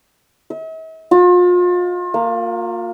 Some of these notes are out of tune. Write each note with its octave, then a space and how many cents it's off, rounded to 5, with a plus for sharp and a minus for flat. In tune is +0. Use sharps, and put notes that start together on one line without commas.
E5 -45
F4 +35
A#3 -15